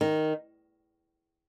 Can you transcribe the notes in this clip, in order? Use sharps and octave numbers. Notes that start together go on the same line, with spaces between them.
D#3